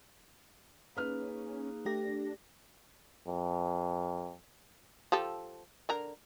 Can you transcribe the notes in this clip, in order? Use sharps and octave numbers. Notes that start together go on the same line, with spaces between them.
A#3 C#4 D#4 G#4 B4 F6
A3 D4 G4 A#6
F2
F3 G4 A4
D3 A#4 A#5